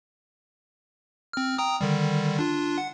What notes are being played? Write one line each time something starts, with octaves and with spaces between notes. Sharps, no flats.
C4 F6
G5 A#5 D#6
D3 D#3 G3
D4 F4
F#5